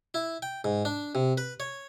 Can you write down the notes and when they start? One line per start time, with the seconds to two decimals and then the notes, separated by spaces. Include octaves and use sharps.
0.14 E4
0.42 G5
0.64 G#2
0.85 D4
1.15 C3
1.38 B4
1.60 C#5